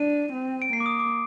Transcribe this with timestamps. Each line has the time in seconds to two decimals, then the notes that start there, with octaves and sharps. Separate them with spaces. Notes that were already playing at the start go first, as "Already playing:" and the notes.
Already playing: D4 D#7
0.32 C4
0.62 D7
0.73 A#3 C7
0.80 D6
0.86 D#6
0.99 D6